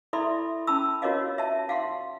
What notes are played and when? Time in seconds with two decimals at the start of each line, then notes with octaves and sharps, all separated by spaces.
0.13 E4 A4 D5 E5 B5 C6
0.67 C#4 A5 B5 E6
1.02 F4 F#4 A#4 C#5 D#5 F5
1.38 E5 A5
1.69 F5 F#5 C6